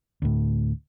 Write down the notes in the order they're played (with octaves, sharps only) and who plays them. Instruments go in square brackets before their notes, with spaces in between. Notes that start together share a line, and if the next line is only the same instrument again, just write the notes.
[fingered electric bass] D2 A2